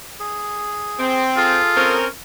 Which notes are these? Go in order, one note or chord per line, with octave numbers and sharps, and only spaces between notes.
G#4
C4
F4 G#4 A4
C4 C#4 A#4